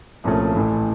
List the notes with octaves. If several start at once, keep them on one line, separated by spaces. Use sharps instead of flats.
C2 A#2 F3 A3 C#4
A1 A2 E3 A3